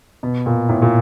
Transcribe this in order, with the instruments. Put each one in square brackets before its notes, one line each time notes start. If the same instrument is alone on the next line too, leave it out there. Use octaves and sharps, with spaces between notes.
[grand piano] B2
A#2
A2
A#2